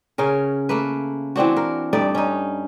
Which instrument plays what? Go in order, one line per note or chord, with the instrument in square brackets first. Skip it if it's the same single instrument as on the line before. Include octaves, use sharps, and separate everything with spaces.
[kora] C#3 C#4 A#4
A3 A#3 B4
E3 C4 D4 F#4
A#4
G2 A3 D#4 D5
C#4 D#4